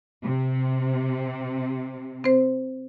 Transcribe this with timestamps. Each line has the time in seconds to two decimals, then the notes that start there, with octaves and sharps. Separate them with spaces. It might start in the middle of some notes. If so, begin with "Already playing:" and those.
0.24 C3
2.24 C4 C5